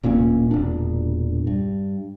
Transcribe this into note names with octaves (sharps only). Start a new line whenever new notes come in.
D1 A#2 A#3 C#4
E1 A#2 D4
G2